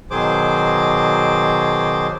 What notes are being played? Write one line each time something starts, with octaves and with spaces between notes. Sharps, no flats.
B2 D#3 F#3 G#4 C5 D6